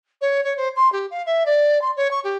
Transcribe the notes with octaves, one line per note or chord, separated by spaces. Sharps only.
C#5
C#5
C5
C6
G4
F5
E5
D5
C6
C#5
C#6
G4